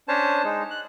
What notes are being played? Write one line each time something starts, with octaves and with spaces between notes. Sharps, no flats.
C#4 D4 C5 C#5 A5
G#3 D#4
F#6